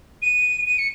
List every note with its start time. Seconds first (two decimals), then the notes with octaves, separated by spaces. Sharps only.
0.22 D#7
0.66 D#7
0.78 C#7